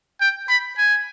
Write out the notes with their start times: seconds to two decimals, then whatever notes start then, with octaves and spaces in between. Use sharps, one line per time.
0.21 G5
0.49 B5
0.78 G#5